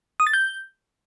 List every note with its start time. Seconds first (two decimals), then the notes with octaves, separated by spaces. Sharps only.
0.20 D#6
0.27 A6
0.33 G6